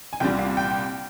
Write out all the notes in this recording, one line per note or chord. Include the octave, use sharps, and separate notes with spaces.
G#5
C2 A#2 G3 G5
F5
G5